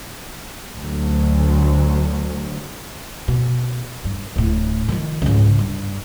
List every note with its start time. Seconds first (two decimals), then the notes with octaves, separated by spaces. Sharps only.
0.76 D2 F#3
3.28 B2
4.05 G2
4.36 D1 A2
4.88 D#3 F3
5.22 C#2 G#2
5.59 G2